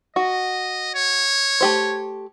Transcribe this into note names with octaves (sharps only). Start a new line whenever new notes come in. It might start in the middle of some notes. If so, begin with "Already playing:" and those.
F#4 D#5
C#5
A3 G4 C5